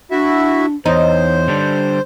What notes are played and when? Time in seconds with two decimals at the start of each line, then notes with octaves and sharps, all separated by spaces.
0.11 D4 E4 F#4 E5
0.86 E2 D#4 C5 C#5
1.48 D3 G3 D4